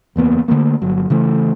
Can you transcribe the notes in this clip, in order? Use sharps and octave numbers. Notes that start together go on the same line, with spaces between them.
F#1 E2 A#3 B3
D3 E3 A3 A#3
G1 F#3
C#3 E3 A3